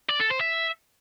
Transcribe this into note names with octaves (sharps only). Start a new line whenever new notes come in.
D5
A4
C5
E5